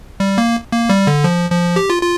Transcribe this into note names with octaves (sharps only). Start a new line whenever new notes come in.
G3
A#3
A#3
G3
D3
F3
F3
G4
F4
F4